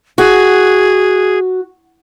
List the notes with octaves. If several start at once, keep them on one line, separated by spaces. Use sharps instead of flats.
F#4 G#4